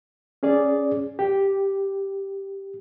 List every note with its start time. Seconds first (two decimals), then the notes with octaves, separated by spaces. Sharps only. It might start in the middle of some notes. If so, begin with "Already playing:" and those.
0.43 C#4 G#4 D5
1.19 G4